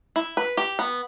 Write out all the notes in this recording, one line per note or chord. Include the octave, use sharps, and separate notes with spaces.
E4
B4
G4
B3